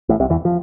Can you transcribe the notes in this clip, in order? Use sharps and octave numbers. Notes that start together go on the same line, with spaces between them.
A1 A2
C2 C3
E2 E3
F3